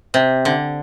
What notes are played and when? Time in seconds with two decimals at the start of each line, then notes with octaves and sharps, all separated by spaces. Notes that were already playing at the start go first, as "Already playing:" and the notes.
0.14 C3
0.45 D3